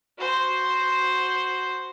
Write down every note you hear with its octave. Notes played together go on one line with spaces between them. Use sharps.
F#4 C5